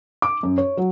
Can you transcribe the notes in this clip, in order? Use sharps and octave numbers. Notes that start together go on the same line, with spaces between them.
D6
F#2
C#5
F#3